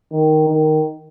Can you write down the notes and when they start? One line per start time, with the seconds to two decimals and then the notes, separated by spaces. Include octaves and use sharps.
0.12 D#3
0.48 D#3